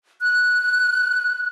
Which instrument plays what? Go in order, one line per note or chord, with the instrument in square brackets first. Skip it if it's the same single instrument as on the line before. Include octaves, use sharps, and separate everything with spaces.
[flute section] F#6